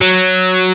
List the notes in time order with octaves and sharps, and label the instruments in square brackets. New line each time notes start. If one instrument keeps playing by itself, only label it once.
[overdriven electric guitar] F#3